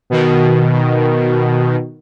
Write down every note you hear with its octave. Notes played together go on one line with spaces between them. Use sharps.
B2 D#3